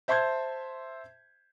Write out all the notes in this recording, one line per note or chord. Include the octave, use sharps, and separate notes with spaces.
C5 E5 A5 C6 G6 G#6